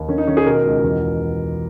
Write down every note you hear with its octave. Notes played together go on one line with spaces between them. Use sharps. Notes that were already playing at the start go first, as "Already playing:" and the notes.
Already playing: D#2
D#3 C#4
D#4
D#3 C#4
G#4
B2 A#4
C#2
E2